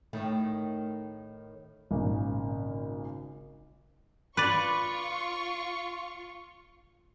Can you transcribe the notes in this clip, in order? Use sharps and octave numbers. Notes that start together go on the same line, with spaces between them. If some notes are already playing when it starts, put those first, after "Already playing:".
A2 D#3 A3
G#1 A#2 C#3
F4 B4 D5 C#6